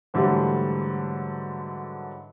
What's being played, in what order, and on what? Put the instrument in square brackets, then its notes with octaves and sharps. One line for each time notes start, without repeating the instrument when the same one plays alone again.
[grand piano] G#2 D3 E3 F#3 G3 A3